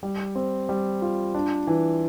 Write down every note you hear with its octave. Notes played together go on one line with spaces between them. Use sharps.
G3
C4
G3
F4
D4
E3